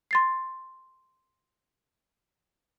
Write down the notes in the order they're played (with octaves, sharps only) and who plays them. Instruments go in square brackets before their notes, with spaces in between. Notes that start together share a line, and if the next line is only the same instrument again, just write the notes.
[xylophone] C6 A6 C7